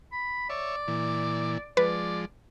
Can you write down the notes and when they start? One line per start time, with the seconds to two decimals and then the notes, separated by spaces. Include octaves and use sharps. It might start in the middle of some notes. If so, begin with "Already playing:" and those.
0.12 B5
0.50 C#5 D5 E5
0.88 A#2 E3
1.77 F3 G#3 B4 D5